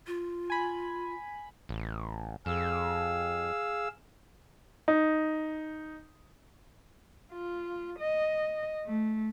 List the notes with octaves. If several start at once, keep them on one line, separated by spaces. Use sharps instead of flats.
F4
G#5 B5
A1
F2 G#4 F5 E6
D#4
F4
D#5
A3